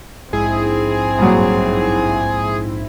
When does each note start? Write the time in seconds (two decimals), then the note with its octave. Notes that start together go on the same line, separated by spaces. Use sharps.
0.33 A#1 G#2 C4 E4 G#4
1.19 G2 A#2 F#3